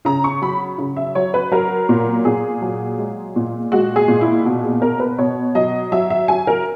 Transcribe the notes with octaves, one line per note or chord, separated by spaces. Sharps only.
C#3 A#5
C#6
F#3 B5
C#3
E5
F#3 C#5
B4
F#3 A#4
A#2
A#2 G#4
F#3
G#3
A#2
G#3 F#4
G#4
A#2
E4
B2 F#4
G#4
B2 A#4
B4
B2 C#5
F#3 D#5
F#3 E5
E5
F#3 G#5
A#4